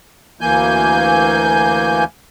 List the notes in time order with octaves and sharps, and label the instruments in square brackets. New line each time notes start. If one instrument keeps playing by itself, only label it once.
[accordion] D2 E3 A#3 G#5 G6